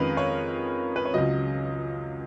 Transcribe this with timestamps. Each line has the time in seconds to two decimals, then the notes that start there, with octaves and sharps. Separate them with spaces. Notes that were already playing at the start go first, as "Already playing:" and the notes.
Already playing: F2 D#3 G#3 C#4 A#4 B4 F5
0.17 C#5
0.96 B4
1.05 C#5
1.14 C#2 C#3 F#3 D#5